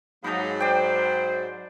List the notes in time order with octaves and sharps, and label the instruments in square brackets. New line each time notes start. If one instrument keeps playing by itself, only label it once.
[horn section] G#2 F#3 [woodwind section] A#3 D#4 [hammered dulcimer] A5 B5
[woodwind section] C5 [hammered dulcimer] D5 G5